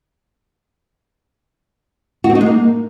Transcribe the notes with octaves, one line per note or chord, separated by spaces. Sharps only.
F#4
C4
D#4
G#3
A#3